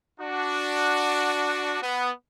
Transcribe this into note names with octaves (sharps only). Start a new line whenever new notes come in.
D4 F#4
B3